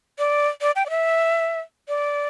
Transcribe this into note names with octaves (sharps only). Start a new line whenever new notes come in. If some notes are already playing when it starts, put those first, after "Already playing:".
D5
D5
G5
D5
E5
D5